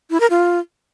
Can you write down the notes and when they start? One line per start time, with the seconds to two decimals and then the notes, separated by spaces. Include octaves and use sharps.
0.10 E4
0.20 A#4
0.30 F4